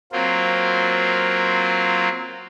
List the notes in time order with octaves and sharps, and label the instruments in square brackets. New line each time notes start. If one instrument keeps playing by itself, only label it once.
[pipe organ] F#3 A#3 C4 F4